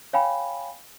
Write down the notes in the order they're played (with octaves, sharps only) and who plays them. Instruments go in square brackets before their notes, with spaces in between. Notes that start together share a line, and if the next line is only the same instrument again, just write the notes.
[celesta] C#5 F5 G5 G#5 B5